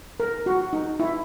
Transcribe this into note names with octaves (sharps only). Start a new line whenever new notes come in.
A#4
F#4
D#4
E4